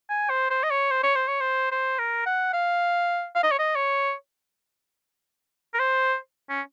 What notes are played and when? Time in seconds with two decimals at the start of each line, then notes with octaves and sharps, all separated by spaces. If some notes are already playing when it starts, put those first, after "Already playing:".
0.09 G#5
0.30 C5
0.50 C5
0.63 D#5
0.71 C#5
0.91 C5
1.03 C#5
1.16 C5
1.28 C#5
1.41 C5
1.72 C5
1.99 A#4
2.26 F#5
2.53 F5
3.35 F5
3.43 D#5
3.51 C#5
3.59 D#5
3.76 C#5
5.74 A#4
5.79 C5
6.50 C#4